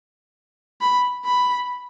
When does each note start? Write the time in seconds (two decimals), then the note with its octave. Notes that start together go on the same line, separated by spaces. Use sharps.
0.81 B5
1.25 B5